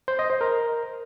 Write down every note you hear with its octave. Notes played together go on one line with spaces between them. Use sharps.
C5
D#5
C5
A#4